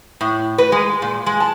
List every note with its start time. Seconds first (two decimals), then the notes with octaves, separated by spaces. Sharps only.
0.21 A2
0.58 B4
0.72 G#3
1.02 A#2
1.26 G#3
1.40 A5